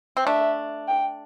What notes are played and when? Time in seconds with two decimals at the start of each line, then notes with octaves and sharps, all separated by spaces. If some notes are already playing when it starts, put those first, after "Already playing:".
0.17 C4
0.26 A3 D4 E5
0.88 G5